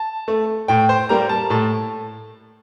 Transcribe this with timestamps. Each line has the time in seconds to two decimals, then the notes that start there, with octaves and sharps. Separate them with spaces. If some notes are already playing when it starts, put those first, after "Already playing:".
Already playing: A5
0.28 A3
0.68 A2 G5
0.89 C5
1.09 G3 A#3 A#5
1.29 A5
1.50 A2 A5